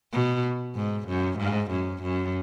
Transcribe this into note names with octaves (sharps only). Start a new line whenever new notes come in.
B2
G#2
F#2
G#2
F#2
F#2